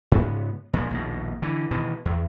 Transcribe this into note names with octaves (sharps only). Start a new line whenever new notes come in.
G#2 C#3 B3
A#2 F3 G#3
A#1 D#2 B2
D3 E3
B2 D#3 E3
E2